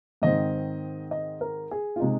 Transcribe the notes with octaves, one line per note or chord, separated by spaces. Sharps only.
G#2 D#3 C4 D#5
D#5
A#4
G#4
F4
C3 G#3 D#4